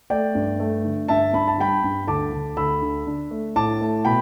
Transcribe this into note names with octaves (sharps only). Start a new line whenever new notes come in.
A3 D5 G5
G2
A3
D3
G2 E5 A5
G2 B5
A5
G3 G5 B5
G2
D2 A5 D6
D2
D2 B5 E6
D3
D4
A3
A2 A5 D6
A3
B2 G5 B5